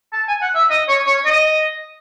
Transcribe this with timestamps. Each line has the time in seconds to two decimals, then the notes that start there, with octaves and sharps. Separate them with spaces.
0.13 A5
0.28 G#5
0.41 F#5
0.55 E5
0.70 D#5
0.88 C#5
1.07 C#5
1.25 D#5